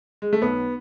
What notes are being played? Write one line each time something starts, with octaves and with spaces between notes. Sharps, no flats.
G#3
A3
B1 B3